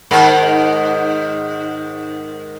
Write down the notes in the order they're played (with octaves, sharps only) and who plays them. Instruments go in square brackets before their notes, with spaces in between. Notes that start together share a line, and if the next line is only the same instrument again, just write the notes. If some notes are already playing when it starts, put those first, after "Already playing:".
[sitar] G#2 D#3 A#4